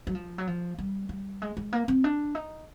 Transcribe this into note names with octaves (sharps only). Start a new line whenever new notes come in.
F#3
F3
F#3
F3
G3
G3
G#3
G#3
A#3
C4
D4
D#4